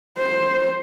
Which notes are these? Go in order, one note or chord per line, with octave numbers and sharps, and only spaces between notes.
C5